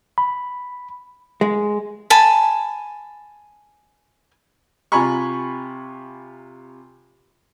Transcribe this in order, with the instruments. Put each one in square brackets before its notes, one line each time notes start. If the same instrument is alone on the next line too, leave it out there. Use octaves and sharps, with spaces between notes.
[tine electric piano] B5
[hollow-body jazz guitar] G#3
[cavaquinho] G#5 A5 B5
[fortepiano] C3 F4 G#5 A#5 B5 C#6